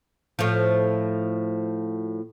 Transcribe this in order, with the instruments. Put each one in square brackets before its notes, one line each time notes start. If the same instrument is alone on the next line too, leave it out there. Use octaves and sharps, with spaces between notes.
[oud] A2 F3